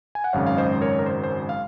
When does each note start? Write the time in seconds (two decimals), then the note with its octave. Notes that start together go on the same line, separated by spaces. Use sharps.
0.15 G#5
0.24 F#5
0.33 G#1 F#2 C#3 G#3 C#5 F5
0.47 F5
0.57 C5 D#5
0.81 A#4 C#5
0.99 A#4
1.06 C5
1.24 C5
1.49 F5